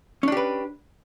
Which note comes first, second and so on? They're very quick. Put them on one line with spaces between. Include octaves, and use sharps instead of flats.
C#4 D4 G4 B4